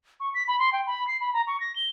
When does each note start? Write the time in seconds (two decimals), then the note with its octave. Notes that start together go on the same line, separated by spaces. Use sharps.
0.20 C#6
0.34 B6
0.48 B5
0.59 C6
0.73 G5
0.87 B5
1.07 C7
1.20 B5
1.33 A#5
1.47 C#6
1.60 A#6
1.76 G7